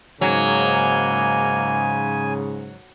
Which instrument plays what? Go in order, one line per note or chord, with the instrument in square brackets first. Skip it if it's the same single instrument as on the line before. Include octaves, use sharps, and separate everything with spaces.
[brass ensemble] G#2 C#3 [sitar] F#3 [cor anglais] A#3 [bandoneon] G#5